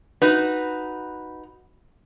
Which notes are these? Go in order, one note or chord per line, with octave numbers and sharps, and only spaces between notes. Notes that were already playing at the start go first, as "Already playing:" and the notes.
D#4 F#4 B4